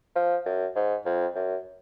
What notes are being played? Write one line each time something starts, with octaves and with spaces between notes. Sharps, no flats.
F3
F#2
G#2
F2
F#2